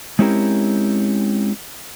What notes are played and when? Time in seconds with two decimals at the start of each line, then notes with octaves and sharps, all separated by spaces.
0.19 G#3 C4 C#4 E4 G4 A#4